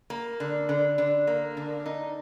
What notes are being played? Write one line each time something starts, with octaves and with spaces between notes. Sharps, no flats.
A#3
D3
D3
D3
A#3
D3
D#4